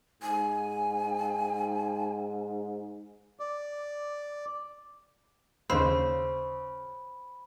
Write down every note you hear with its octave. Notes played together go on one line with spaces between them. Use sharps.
G#2 G#5
D5
D#2 C#3 C5 D#5 F5 B5 E6 F#6